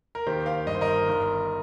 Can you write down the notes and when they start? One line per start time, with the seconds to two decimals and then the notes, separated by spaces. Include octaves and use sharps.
0.15 A#4
0.27 D#2 D#3 G4 C5
0.46 C5 F5
0.66 G1 G2 D#3 D#5
0.75 C5
0.81 A#4 D#5
1.07 G1 G2 D#3